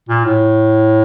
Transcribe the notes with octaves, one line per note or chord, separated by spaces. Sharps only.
A#2
A2